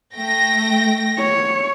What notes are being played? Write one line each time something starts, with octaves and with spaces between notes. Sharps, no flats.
A3 G5 A#6
C#5